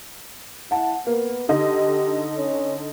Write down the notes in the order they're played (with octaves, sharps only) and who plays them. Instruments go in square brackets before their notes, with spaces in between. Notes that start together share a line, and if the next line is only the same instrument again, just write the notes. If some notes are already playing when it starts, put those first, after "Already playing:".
[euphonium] E4 [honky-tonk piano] F#5 A5
[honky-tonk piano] A#3 [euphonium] B3
[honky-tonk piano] D3 D#4 D#5 [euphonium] G4
[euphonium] C#4